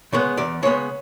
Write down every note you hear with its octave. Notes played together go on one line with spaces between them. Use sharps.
C#3 G#3 B3 C#5
E2 D5
C#3 G#3 B3 C#5